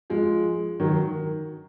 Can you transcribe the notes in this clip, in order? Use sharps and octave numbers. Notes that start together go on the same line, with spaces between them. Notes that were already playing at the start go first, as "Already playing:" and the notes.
F3 G#3
D#3 F#3